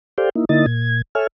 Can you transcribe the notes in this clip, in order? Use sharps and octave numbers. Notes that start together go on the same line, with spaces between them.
G4 A4 C5 D5 F5 G5
A#3 D#4 E4
D3 A#3 D#4 E4 D#5 A6
A#2 G#6
A4 C#5 E5 G#5 F6